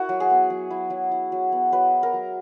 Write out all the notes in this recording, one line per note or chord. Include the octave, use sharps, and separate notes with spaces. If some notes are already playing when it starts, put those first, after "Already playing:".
Already playing: E4 F#4 A#4
F#3
G#4
B3
F#3
E4
F#3
E4
F#3
B3
F#3 B4
E4
A#4
F#3